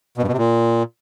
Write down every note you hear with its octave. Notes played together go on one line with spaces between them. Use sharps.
B2
G2
B2
C3
A#2